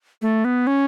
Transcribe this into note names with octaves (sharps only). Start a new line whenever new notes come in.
A3
B3
C#4